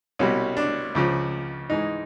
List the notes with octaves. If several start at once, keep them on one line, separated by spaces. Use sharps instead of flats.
C2 B2 G3 C#4
D4
C#2 C#3 F3
G#2 E3 G#3 D#4